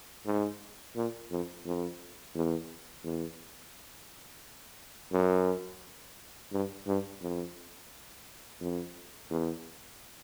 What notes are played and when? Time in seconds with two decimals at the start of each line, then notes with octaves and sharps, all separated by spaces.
0.26 G#2
0.96 A#2
1.31 F2
1.65 F2
2.35 E2
3.04 E2
5.12 F#2
6.53 G2
6.87 G2
7.22 F2
8.61 F2
9.30 E2